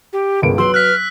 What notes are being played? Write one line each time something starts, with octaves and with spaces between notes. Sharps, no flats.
G4
G1 C#2 A#4 D7
F#3 B4 C6 E6
F6 F#6 B6